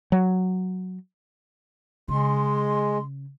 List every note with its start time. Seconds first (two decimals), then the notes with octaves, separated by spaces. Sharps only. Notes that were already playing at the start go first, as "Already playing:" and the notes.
0.12 F#3
2.08 C#3 G#3 C6